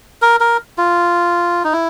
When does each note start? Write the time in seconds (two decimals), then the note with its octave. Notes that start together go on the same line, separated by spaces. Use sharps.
0.22 A#4
0.40 A#4
0.78 F4
1.64 D#4
1.73 E4